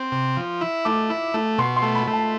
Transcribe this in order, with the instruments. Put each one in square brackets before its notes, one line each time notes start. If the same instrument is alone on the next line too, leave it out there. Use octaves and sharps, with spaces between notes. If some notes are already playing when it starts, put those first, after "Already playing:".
Already playing: [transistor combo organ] C4
C3
F3
E4
[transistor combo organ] A3 [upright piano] D6
[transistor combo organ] E4
A3
[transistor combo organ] B2 [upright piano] C6
[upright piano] C6
[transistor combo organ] A3
[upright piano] B5
[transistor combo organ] A3
[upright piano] A5